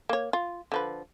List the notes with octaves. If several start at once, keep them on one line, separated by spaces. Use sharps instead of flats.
A#3 C#5
F4
D3 F3 B4